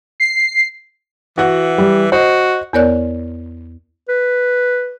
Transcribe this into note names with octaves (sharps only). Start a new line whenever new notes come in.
C7
E3 F#4 F#5
G3
F#4 C5 D#5
E2 B3 A#4 C#5 D5 F#6
B4